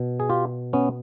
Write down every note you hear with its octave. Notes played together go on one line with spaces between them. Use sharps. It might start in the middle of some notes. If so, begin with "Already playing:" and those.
Already playing: B2
G#4
F4 G4
B3 C#4